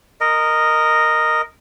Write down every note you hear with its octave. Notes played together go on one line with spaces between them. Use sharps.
A#4 D#5